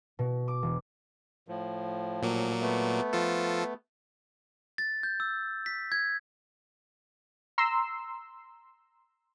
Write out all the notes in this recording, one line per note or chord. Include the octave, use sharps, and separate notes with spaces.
B2
D6
E1
A2 F3
A#2 F#3 A#3
A3 B3
F3 F4 A4
A6
G6
E6
B6
G#6
A#5 C6 E6 C7